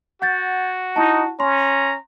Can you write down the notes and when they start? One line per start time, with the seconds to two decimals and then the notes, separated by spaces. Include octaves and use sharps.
0.22 F#4 F#5 G6 A6
0.96 D#4 E4 A5
1.40 C#4 A#5 C6